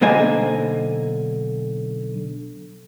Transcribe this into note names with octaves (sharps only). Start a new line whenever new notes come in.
B1 D3 A#3 C5 D#5 G#5